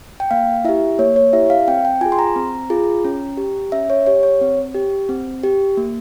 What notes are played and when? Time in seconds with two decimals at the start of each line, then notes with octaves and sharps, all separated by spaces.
0.20 G5
0.31 A#3 F5
0.65 E4 G4 E5
0.99 A#3 C#5
1.16 C#5
1.33 E4 G4 E5
1.50 F5
1.68 C4 G5
1.85 G5
2.01 F4 G#4 G#5
2.12 C6
2.19 A#5
2.36 C4
2.70 F4 G#4
3.05 C#4
3.37 G4
3.72 C#4 E5
3.90 C#5
4.06 G4 C#5
4.23 C#5
4.41 C4
4.75 G4
5.09 C4
5.43 G4
5.77 A#3